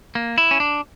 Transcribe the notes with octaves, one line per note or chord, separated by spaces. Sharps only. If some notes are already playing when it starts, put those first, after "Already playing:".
A#3
E4
C#4
D4